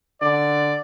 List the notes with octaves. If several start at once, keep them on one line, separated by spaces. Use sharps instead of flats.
D3 D5